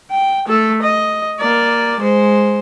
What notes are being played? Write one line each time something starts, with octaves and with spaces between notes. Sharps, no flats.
G5
A3 A4
D#5
A#3 D5
G#3 C5